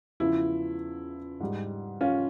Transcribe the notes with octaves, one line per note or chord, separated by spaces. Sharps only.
E2 C#3 F3 E4
G#2 G3
C#4 F4